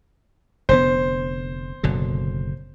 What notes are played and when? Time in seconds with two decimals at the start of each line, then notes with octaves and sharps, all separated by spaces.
0.69 F1 D3 B3 C5
1.83 F#1 B2 D3